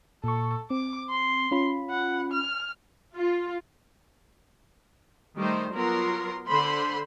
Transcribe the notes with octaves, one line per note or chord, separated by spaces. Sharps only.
A#2 A4 C#6
C4 D6
C6
C#4 F4 B5
F#5
F6
F4
D#3 G3 A3 D#4 C5
F#3 B3 F4 A#4 A#5 C6
D3 C5 B5 C6